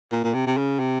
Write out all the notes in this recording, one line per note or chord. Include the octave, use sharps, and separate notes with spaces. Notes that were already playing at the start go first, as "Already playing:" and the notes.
A#2
A#2
C3
C3
C#3
C3